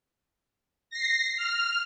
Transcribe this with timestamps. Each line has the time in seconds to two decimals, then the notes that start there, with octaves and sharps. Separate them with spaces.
0.90 A#6 C7
1.37 F6